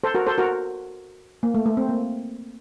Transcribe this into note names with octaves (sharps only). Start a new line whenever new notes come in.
A4 C5
F#4 A#4
A4 C5
F#4 A#4
A#3
A3
A3
C4
A#3